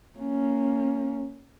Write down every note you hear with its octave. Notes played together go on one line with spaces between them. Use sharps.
A#3 C#4